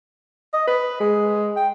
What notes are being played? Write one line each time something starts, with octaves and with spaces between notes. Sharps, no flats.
D#5
B4
G#3
G5